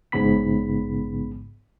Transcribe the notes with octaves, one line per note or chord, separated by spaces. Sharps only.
A1 G#2 C#3 B3 B5 B6